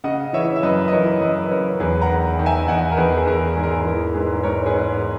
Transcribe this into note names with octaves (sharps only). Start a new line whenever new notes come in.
C#3 D#5 F#5
E3 C#5 E5
E5
F#2 B4 D#5
D#5
E3 A#4 C#5
F#2 B4 D#5
B4
C#3 A#4 C#5
E2 G#4 B4
F#5 A#5
D#3
D#3
E5 G#5
E2 D#5 F#5
A#4
E2 G#4 B4
G#4
E2 A#4
G#2 G#4
A#4
G#4
E3 A#4
G#2 G#4 B4
G#2 A#4 C#5
G#4 B4
G#2